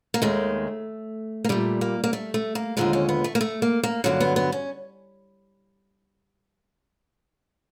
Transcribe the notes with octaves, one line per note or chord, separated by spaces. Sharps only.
A#3
D#2 D#3 G#3 A3
A#3
A#2 G3 A3
A#3
A#3
A3
A3
A#3
D#2 D3 F3 G#3 D#4
C#4
B3
A3
A#3
A3
A#3
A#3
G2 D3 F#3 A#3
B3
B3
C#4